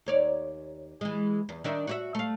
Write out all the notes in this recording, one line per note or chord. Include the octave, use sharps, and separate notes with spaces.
D#2 C#5 D5
E3 G#3
E2
D#3 D4 E5
F#4 C#5 E5
A3 F5